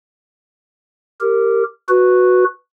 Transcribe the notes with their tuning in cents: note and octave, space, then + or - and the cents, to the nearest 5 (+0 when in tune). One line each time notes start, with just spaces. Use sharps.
G4 +0 A#4 -15
F#4 -10 B4 +0